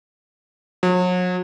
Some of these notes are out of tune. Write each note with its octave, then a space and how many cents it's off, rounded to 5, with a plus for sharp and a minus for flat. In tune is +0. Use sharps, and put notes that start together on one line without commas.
F#3 -35